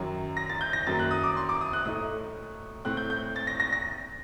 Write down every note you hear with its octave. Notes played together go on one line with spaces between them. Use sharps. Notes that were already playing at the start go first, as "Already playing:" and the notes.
Already playing: F#2 D#3 F#3
A#6
A6
G6
A#6
F#2 D#3 F#3 A#3 A6
F#6
D#6
D6
C6
D6
D#6
F#6
A2 A3 D#4 D#6
A2 A3 C4 F#6
G6
G6
A6
A#6
A#6
A#6